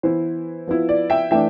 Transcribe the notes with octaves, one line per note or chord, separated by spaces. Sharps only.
E3 B3 E4 C5
F3 B3 E4
D5
E5 G5
E3 A3 D4 E5 G5